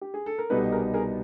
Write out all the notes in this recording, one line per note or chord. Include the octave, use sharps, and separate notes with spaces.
G4
G#4
A4
A#4
C2 B2 G3 B3 D#4 A4 B4
G#4 A#4
G#4 A#4